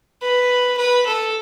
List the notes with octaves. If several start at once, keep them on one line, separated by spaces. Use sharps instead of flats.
B4
B4
A4